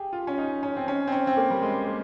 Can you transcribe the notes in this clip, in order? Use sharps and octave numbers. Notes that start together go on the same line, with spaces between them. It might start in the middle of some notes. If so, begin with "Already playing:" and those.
Already playing: G4 G#4
F4
C#4
D#4
C#4
C4
C#4
C4
C#4
C4
A#3
G3
G#3
A#3